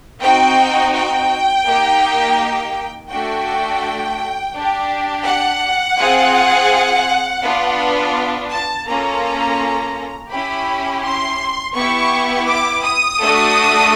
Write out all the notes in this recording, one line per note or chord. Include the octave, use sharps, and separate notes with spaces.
C4 D#4 F#4 G5
G5
A#3 D#4 G4
A3 D4 F#4 G5
D4 G4
F#5
C4 F4 G#4
B3 D4 F4
A5
A#3 C#4 F4 A4 A#5
C#4 E4 G4 B5
C6
B3 E4 G4 C#6
D6
D#6
A3 D4 F#4 A4